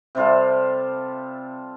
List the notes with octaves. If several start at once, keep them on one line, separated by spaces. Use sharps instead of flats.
C3 G3 F4 A4